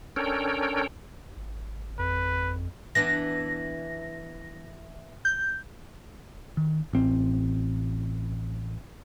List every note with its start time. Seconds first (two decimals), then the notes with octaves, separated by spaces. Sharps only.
0.16 C#4 D4 A4 A#4 C#5 G5
1.36 G#1
1.99 F2 B4
2.95 E3 B3 D4 A#6
5.25 G6
6.57 D#3
6.93 A1 C4